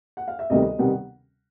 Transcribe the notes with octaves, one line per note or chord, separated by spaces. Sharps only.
F#5
F5
E5
D2 C3 D#3 G3 B3 D#5
C3 D#3 G3 B3 F#5